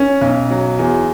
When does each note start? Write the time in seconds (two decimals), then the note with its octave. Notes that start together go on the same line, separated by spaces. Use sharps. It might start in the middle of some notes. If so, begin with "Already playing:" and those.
Already playing: C#4
0.21 B1
0.50 F#3
0.79 E2